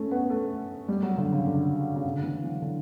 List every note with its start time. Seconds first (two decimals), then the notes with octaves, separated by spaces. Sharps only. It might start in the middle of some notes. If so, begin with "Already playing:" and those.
Already playing: A3 C#4
0.11 B3
0.30 A3
0.88 G3
1.03 F#3
1.17 D3
1.32 C#3
1.47 D3
1.96 C#3
2.05 D3
2.23 E3
2.44 F#3
2.62 D3